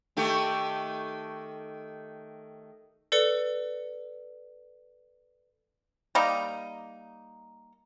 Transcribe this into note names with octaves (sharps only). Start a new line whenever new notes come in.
D#3 A3 G4
A4 B4 D5 C#7
G3 A#3 D#4